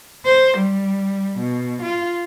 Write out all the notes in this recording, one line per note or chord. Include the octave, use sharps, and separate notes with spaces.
C5
G3
B2
F4